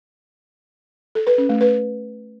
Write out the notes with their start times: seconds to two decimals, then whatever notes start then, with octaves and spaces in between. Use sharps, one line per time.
1.15 A4
1.27 B4
1.38 C#4
1.49 A3
1.61 B4